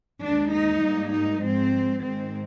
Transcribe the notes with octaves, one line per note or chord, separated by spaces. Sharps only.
D#2 D#3 G#3 D4
D#4
G#2 G3 A#3
D#4
G#2 F3 G#3 C4
G#2 D#3 G#3 C4